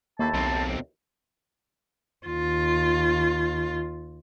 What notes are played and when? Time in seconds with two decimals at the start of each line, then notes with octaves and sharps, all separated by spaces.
0.19 D#2 A3 A#3 E4 A5
0.34 B1 B2 C4
2.27 D#2 F4